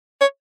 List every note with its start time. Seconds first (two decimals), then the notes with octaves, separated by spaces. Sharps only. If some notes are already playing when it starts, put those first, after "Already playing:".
0.21 C#5